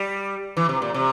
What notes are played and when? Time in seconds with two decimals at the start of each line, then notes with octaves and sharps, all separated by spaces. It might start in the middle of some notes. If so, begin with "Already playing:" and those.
Already playing: G3
0.57 E3
0.69 C3
0.82 A#2
0.94 C3